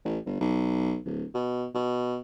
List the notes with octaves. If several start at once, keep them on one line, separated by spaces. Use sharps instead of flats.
A1
G1
B1
D1
B2
B2